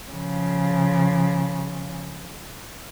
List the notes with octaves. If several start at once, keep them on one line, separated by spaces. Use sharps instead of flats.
C#3 F3